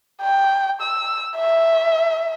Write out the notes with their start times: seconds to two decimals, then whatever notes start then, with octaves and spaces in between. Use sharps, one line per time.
0.21 G5
0.81 E6
1.37 E5